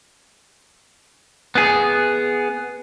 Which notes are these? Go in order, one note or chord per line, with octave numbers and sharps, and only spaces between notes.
B3 G#4